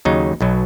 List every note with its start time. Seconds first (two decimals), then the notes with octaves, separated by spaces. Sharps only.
0.05 D#2 C#3 F#3 D#4
0.41 B1 B2 F#3